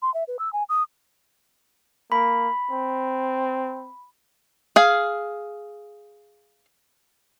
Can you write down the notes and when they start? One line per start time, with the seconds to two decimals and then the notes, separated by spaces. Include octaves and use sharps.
0.02 C6
0.14 E5
0.28 B4
0.39 E6
0.53 G#5
0.69 D#6
2.12 A#3 B5
2.71 C4
4.76 G#4 F5